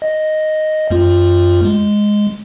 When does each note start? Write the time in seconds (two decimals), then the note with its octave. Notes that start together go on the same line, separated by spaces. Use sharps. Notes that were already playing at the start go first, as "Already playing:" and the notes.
0.02 D#5
0.90 F#2 A3 F4
1.65 G#3